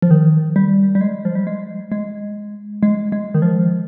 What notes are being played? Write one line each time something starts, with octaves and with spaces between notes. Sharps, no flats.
F3
D#3
G3
G3
G#3
F3
G3
G#3
G#3
G#3
G#3
D#3
F3